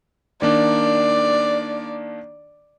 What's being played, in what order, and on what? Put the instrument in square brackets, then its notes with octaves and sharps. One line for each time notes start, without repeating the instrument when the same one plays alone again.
[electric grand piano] D#3 A#3 D4 [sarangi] D5